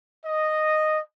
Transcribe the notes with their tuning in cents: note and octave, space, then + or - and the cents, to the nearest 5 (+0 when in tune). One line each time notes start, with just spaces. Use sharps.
D#5 -5